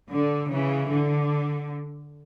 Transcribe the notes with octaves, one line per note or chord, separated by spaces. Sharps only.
D3
C#3 E3
D3